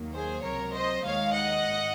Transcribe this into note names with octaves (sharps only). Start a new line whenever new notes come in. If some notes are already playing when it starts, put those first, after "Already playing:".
Already playing: D#2 D#3 F#3 A#3
G#4 C5
C#2 C3 F#3 A#4 C#5
C5 D#5
D#2 D#3 G#3 C#5 F5
D#5 F#5
G#1